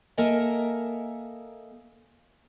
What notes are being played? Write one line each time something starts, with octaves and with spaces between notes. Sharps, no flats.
A#3 A4 A#4 D#5 E5 G#5